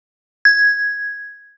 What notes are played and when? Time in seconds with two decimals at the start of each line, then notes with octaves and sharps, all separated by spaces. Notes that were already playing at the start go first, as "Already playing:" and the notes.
0.45 G#6